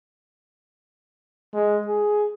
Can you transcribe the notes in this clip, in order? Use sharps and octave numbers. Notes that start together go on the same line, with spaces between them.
G#3
G#4